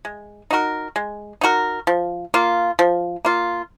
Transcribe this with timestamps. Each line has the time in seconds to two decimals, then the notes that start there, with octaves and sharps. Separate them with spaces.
0.05 G#3
0.51 D#4 F#4 A#4
0.96 G#3
1.41 D#4 F#4 A#4
1.87 F3
2.34 A#3 F4
2.79 F3
3.25 A#3 F4